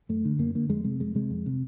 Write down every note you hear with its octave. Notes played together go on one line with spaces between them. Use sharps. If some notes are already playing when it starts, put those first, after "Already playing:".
F#2 A3
D3
F#2 A#3
D3 A#3
F2 G#3
C3 G#3
F2 G#3
C3 G#3
F2
C3